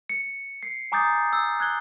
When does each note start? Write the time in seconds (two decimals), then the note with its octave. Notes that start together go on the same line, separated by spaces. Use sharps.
0.09 C#7
0.63 C7
0.92 G#5 A#5 D6 D#6 G6 A6
1.33 E6
1.60 F#6 G#6 G7